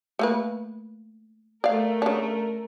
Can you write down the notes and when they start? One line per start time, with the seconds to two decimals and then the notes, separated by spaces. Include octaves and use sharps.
0.19 A3 A#3 B4
1.64 A3 A#4 D5 F5
2.02 C#3 D4